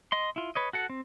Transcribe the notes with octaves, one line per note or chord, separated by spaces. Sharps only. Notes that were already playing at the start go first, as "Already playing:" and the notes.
D#5 C6
E4 F4
B4 C#5 D#5
F#4 A4 F#5
C4